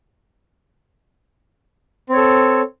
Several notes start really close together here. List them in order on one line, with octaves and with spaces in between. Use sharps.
C4 C#5 A4